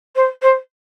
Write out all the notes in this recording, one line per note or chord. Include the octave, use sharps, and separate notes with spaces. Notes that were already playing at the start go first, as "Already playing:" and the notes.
C5
C5